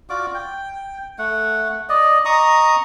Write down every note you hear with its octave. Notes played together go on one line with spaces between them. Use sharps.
F4 F#4 D5 D6
G5
A3 F#5
D5 D#5
D#5 A#5 C#6 D#6